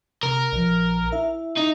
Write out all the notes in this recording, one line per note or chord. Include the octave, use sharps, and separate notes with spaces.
C3 A#4
A#1 F3
E4 E5
D#4